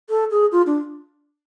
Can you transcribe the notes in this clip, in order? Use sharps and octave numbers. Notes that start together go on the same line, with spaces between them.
A4
G#4
F4
D4